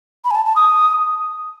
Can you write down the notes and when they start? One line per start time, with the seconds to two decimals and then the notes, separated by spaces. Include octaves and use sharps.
0.25 B5
0.31 G#5
0.35 A5
0.46 A5
0.56 D#6